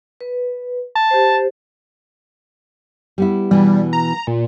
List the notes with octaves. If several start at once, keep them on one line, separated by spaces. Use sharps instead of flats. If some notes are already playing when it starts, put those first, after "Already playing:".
B4
A5
G4 C5
G3 B3 E4
B2 E3 G3
A#5
A#2